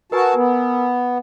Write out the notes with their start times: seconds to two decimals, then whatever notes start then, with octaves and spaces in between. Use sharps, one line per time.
0.12 F#4 A#4 B4 G#5 A5
0.35 B3